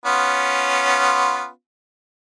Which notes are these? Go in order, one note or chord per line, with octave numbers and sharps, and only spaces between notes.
B3 C#4 F4